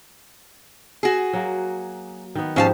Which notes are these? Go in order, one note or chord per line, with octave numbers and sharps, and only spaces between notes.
F#4 G#4
F#3 A#3
D#3 B3
G#2 F3 C#4 G4 F5 A5